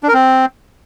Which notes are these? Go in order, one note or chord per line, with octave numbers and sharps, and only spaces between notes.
D4
A#4
C4